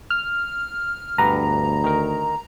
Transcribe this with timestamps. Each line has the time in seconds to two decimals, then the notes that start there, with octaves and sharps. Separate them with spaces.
0.10 F6
1.18 D2 G2 B3 B4 A#5
1.84 D#3 A#4